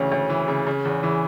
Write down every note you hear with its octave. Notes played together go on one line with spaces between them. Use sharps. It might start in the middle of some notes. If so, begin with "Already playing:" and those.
Already playing: D2 C#3 E3 C#4
D2
E3
C#3
C#3
E2
E3